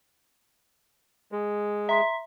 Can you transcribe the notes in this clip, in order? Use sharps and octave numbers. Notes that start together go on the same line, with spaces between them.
G#3
E5 A#5 C6 B6